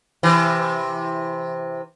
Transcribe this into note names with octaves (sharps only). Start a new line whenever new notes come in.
C3 E3